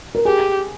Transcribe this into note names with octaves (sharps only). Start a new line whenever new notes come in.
A#4
G4 G#4